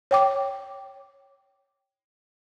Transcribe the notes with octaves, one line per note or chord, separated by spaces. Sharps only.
C#5 G5 D6